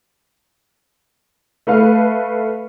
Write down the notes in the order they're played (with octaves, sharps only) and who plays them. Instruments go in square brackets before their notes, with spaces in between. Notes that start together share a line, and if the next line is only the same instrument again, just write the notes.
[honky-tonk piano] A3 B4 F5